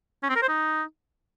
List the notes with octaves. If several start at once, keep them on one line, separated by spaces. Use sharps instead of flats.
C#4
C4
A#4
C5
D#4